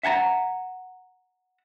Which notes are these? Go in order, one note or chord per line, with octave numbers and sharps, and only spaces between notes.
E5 F#5 G#5 A#5